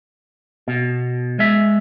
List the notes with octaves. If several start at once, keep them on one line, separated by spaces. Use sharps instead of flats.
B2
G#3 E5